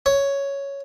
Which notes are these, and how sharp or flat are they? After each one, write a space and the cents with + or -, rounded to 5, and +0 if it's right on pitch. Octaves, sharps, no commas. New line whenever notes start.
C#5 +5